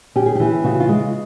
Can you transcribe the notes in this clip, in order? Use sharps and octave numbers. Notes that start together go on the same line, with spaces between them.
C#4 G4
G#4
G4
E3
C#3 F#4
F4
G#3